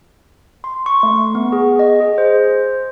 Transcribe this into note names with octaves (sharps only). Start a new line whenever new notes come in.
C6
C#6
A3
B3
G#4
D#5
G#4
C5